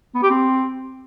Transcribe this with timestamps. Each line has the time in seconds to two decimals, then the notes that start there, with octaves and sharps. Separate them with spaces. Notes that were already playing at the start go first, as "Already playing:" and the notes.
0.15 B3
0.23 G4
0.31 C4